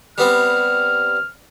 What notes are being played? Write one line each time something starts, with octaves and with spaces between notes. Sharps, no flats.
G3 B3 C4 F6